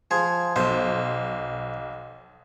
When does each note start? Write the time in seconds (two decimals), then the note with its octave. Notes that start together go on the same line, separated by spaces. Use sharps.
0.11 F3 G#4
0.56 B1 C5